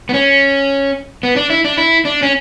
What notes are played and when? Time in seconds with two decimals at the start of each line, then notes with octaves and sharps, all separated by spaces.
0.09 B3
0.14 C#4
1.23 B3
1.36 D4
1.50 E4
1.65 D4
1.78 E4
2.05 D4
2.23 C#4